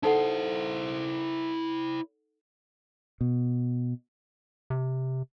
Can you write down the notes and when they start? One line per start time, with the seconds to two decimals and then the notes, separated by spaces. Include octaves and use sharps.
0.03 D#4 E4 A4 C5 F#5
3.21 B2
4.70 C3